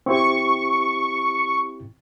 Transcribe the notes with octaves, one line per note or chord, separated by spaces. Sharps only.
C4 E4 G4 C#6